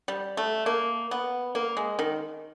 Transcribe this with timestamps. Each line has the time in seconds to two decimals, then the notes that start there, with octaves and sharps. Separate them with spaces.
0.08 G3
0.37 A3
0.66 A#3
1.11 B3
1.55 A#3
1.77 G#3
1.99 D#3